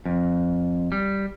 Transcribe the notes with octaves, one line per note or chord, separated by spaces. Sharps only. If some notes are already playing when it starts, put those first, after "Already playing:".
F2
G3